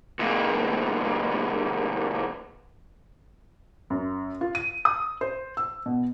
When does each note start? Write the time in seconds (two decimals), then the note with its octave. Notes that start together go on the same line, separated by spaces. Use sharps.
0.19 C#2 A#2
3.90 F#2
4.41 F4
4.55 D#7
4.85 D#6
5.21 C5
5.57 E6
5.86 B2